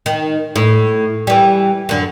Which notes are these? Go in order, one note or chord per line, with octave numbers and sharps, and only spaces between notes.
D#3
A2
E3 G3
F#2 D3